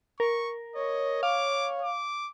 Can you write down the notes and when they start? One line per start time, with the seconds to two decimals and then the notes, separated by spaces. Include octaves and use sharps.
0.20 A#4 C#6
0.75 C#5 D#5
1.23 F5 D6
1.82 D6